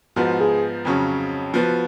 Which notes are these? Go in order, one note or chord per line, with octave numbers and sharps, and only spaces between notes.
G#2 F3 B3 F#4
G#4
F2 C#3 F#3 C#4
F3 B3 F#4